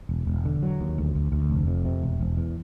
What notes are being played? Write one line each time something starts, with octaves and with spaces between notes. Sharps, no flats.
E1
E1
D3
F#3
D#2
D2
D2
D2
F1
F2
C3
E1
E1
E2